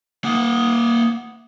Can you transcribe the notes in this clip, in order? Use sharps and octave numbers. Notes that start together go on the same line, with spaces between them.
A#3 F#5